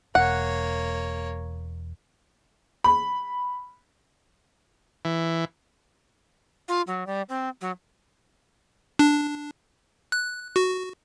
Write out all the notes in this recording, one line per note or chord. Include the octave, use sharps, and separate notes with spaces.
E1 A#3 C#5 F#5
B5
E3
F4
F#3
G3
C4
F#3
D4
F#6
F#4